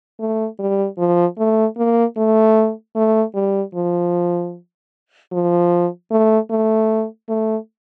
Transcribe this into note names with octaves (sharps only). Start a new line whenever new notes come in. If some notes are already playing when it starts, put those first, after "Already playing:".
A3
G3
F3
A3
A#3
A3
A3
G3
F3
F3
A3
A3
A3